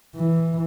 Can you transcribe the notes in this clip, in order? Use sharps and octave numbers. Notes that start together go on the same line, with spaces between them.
E3